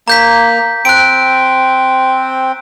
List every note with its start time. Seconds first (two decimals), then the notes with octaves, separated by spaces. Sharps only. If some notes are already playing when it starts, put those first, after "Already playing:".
0.08 A#3 A#5 G6 B6
0.85 C4 F#6 D7